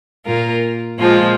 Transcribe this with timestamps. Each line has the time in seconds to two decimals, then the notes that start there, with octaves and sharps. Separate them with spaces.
0.25 A#2 A#3 F4 A#4
0.99 A#2 F3 G#3 F4